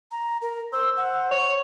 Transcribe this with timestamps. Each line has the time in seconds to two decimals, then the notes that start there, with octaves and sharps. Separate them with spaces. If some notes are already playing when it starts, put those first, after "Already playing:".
0.11 A#5
0.42 A#4
0.73 C5 E6
0.97 F#5
1.31 C#5 C#6